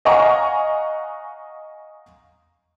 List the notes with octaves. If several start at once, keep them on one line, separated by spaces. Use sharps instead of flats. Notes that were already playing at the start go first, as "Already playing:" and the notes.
D#5 F5 F#5 G#5 A#5 C#6